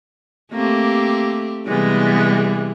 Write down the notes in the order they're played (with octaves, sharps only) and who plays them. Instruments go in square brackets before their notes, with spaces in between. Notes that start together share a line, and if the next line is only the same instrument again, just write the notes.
[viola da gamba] A3 C4 G4 [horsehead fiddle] A#3
[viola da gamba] C3 E3 G3 [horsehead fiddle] G#3 B3